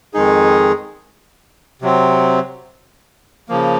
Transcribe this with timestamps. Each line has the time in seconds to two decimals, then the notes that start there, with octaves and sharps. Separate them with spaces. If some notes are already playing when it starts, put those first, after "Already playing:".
0.14 F2 D#3 G#3 D#4 G#4
1.82 C3 F#3 C4
3.49 C#3 F3 A#3